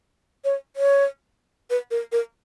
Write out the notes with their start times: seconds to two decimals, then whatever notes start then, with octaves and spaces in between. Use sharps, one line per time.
0.44 C#5
0.76 C#5
1.70 B4
1.91 A#4
2.12 A#4